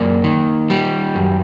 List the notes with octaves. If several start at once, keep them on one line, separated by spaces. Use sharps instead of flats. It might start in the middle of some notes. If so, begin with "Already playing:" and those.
Already playing: F#2 A#3 D5
D#3
G3
F#2